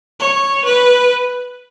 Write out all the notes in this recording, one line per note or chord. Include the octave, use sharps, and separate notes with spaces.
C#5
B4